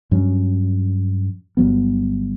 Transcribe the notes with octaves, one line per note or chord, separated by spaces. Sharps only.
G2 F#3 C#4
G1 G2 F#3 B3